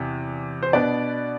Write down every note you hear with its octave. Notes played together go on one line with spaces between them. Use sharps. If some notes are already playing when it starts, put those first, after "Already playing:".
Already playing: E2 C3
C5
B2 B3 D4 D5